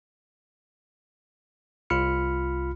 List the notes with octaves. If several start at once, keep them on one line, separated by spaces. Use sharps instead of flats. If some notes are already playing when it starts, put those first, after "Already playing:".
C2 F4 B5 F6 C#7